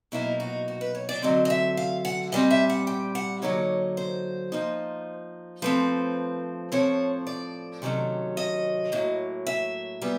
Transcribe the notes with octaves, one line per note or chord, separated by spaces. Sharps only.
B2 F#3 A#3 D#4 E4
F#4
F#4
B4
C#5
D5
D3 F#3 A3 C4 D#5
D#5
E5
F5
F#5
A#2 G3 C4 D#5
E5
F#5
G5
F#5
D3 F#3 A#3 D#4 C#5
C5
F3 A#3 D#4
F3 A3 C4 B4
A2 F3 A3 C4 C#5
D5
C3 D#3 F#3 A3 C#4
D#5
A2 F#3 A#3
E5
A#2 G3 B3